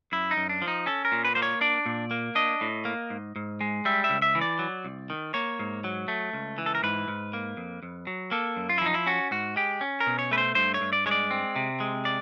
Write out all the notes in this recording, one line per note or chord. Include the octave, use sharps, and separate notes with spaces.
F#2 E4
D#4
F#2
D4
F3
D#4
C#4 A4
A#4
A#2
B4
A#3 C5
C#5
D4 D5
A#2
A#3
D4 D#5
A2
A#3
G#2
G#2
G#3
G3 E5
E5
C#2
E5
E3
D5
F#3
C2
D#3
A#3 C#5
G#2
F#3
A3
C#2
E3
A4
A#4
G#2 B4
G#2
A#3
F2
F2
F#3
A#3 A4
F#2
F4
E4
F3 D#4
E4
C#4 F#4
G#2 F#4
G#3 G4
C#4
A#4
B2
C#5
A3 B4
C5
G2 C5
C#5
G2
D5
G#3 C#5
D5
C4
C3
G#3
D5